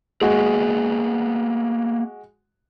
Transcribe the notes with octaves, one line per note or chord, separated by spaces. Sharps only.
G#3 A#3 B3 F#4 G#4